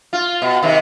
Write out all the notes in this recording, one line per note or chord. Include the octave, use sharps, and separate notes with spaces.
F4
B2
C3 D#3